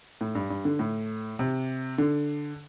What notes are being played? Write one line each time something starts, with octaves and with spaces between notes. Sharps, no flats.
A2
G2
G2
D3
A2
C3
D3